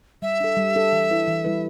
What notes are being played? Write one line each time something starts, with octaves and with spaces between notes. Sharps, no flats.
G3 E5
D4 A4
G3
D4 A4
E3
G3 E4 B4
E3
G3 E4 B4